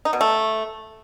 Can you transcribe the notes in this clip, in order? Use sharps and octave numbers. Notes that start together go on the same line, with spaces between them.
D#4
B2
A3